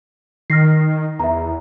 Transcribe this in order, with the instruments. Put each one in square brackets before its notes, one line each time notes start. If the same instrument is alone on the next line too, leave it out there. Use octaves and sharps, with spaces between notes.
[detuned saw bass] D#3 [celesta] F6 A#6 C7
[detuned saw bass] E2 [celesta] E5 A#5